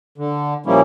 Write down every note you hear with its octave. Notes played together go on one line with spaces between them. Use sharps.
D3
A#2 F3 G3 A#3 C#4 E4